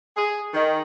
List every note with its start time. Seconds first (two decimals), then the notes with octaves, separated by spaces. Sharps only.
0.16 G#4
0.53 D#3